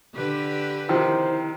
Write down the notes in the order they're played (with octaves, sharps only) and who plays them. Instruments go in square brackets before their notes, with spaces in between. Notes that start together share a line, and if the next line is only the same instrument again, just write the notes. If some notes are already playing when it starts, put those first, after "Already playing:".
[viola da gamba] D3 G4 B4
[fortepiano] C3 D#3 F3 [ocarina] E4 [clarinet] C5